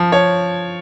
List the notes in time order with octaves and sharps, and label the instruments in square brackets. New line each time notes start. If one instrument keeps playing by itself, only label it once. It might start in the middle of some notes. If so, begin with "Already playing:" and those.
Already playing: [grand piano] F3
[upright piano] C#5